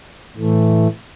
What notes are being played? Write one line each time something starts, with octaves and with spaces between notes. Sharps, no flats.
A2 E3 A3